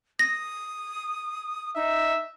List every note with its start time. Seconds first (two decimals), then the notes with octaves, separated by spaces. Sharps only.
0.19 D#6 A#6
1.76 D#4 E5